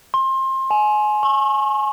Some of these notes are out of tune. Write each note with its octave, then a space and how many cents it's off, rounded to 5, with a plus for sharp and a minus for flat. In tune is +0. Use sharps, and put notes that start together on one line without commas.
C6 +25
G#5 +25
C#6 -35